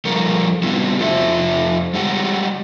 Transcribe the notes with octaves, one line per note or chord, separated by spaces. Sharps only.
F3 G3 A4 A#4
G3 B3 C4 E4 F#4
F2 F4 A4 C5 E5
G3 G#3 G4 F#5 G5